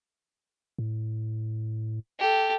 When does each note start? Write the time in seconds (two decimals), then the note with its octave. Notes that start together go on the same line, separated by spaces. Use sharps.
0.78 A2
2.19 G4 A4